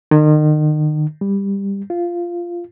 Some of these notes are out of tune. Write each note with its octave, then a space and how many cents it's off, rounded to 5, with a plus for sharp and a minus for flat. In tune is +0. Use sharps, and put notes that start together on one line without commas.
D#3 -35
G3 +15
F4 -10